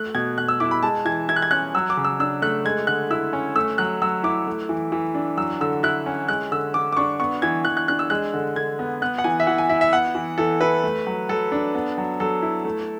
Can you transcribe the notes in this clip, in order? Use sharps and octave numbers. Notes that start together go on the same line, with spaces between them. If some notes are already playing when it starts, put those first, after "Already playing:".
Already playing: A3 F#6
B2 G#6
B2 F#6
E6
E4 D6
B5
G#3 A5
E3 G#6
E4 G#6
F#6
G#6
C#4 F#6
F#3 E6
D6
C#3
E6
D4 E6
A3 F#6
G#3 G#6
D3 F#6
E4 E6
C#4
A3 E6
F#3 F#6
F#3 E6
E4 D6
A3
E3
E3
D4
F#3 E6
D3 E6
E4 F#6
C#4
G#3 F#6
D3 E6
D3 D6
D6
D4 C#6
B3 C#6
E3 G#6
E3 F#6
F#6
D4 F#6
E6
G#3 F#6
D3
D3 G#6
B3
B3 F#6
F#5
E3 G#5
E5
E3 F#5
G#5
E4 E5
E5
B3 F#5
E3
E3 A4
E4 B4
A3
F#3
F#3 A4
D4
B3
F#3
F#3 A4
E4
A3